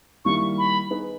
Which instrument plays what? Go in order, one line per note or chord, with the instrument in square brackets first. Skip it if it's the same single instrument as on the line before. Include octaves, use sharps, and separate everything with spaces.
[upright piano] D#3 G3 A#3 E4 [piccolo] C#6
[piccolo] B5
[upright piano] B3 D#4 G#4 B4